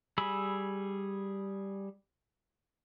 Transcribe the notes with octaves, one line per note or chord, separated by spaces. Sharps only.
G3 G#4 B5 E6